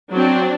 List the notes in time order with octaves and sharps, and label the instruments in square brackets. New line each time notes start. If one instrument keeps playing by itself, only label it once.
[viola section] F#3 C4 D4